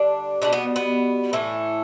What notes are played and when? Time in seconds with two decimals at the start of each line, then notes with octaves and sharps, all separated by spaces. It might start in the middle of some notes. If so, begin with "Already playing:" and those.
Already playing: D3 G3 D4
0.42 B2 G3 D4
0.53 B3
0.76 B3
1.33 A2 E3 A3